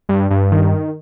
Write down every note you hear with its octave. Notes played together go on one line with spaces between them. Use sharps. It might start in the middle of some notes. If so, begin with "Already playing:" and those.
G2
G2
D#3